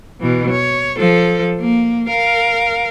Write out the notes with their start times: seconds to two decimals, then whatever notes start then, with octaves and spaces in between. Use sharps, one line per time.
0.20 B2 E3
0.51 C#5
0.98 F3 A4
1.60 A#3
2.09 A#4 F5